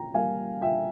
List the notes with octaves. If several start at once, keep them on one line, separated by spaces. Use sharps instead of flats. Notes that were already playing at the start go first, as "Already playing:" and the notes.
Already playing: A#2 G5 A#5
G3 A#3 F5 G#5
A#2 E5 G5